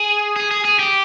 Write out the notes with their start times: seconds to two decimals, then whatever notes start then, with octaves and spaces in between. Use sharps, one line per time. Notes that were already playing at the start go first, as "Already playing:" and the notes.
Already playing: G#4
0.36 G#4
0.51 G#4
0.65 G#4
0.79 G4